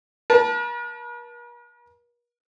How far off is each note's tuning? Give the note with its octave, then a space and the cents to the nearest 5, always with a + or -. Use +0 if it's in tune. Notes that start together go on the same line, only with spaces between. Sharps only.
A#4 +45 A5 +0